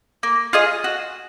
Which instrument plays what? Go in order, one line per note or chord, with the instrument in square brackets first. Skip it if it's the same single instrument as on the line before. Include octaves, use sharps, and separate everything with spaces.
[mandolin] A#3
F4 G#4 D#5
F#4